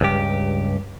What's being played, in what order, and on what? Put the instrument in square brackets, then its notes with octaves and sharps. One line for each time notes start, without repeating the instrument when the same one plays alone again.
[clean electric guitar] C#2 G2 G4